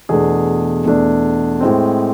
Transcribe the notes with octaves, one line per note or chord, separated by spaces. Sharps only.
E2 B2 A3 D4 G#4
E2 B2 A3 D4
A2 G#3 C4